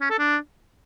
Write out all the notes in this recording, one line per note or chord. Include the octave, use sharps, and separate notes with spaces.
C#4
A4
D4